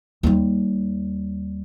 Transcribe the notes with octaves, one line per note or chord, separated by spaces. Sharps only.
D#2 G3